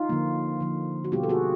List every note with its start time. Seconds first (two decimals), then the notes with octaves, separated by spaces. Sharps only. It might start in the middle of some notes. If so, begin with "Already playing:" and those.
Already playing: D#4 F4
0.09 D3 F3 A#3
0.60 D3 F3 A#3
1.04 F#4
1.12 B2 G3 B3 F4 G4
1.23 A4
1.29 F#4 G#4